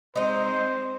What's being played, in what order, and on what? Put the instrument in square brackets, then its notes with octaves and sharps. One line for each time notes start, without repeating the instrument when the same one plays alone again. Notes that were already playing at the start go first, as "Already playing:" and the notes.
[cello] G#3 C4 [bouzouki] D#4 D#5 [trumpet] C5